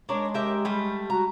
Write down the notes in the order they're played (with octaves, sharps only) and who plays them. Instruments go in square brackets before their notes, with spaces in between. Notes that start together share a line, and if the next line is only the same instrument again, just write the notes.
[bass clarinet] G#3 [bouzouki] D4 A#4 C#5
[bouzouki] G4 A#4 E5
G3 A3
[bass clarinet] F#4 [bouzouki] A#5